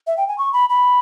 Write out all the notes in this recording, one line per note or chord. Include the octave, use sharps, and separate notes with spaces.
E5
G5
G#5
C#6
B5
B5